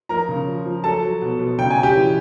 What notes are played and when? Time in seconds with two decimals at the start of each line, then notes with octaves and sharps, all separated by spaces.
0.09 F3 A#4 A#5
0.29 C#3
0.48 F3
0.66 F3
0.84 F#3 A4 A5
1.03 F#3
1.21 B2
1.39 B2
1.58 C#3 G5
1.70 G#5
1.76 C#3
1.83 G4 G5
1.96 E3